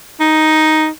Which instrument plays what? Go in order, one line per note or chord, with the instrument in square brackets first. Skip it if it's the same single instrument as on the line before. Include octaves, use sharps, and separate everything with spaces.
[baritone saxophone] D#4